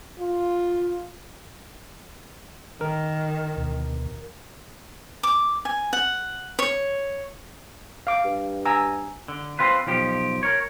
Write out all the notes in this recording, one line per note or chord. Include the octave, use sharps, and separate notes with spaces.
F4
D#3 A#4
D2 B2
D6
G#5
F#5
C#5
F5 D6
G2
G#5 A#5 E6
D3
C4 F4 B4
B1 F3 G4
A#4 C#5